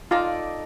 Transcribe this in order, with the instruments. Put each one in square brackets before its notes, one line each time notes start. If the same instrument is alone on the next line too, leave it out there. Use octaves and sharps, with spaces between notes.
[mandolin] D#4 A4 D5 [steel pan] F4